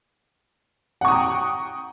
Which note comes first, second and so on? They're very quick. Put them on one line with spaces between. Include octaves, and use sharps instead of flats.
F#5 C#6 D#6 A#5 G5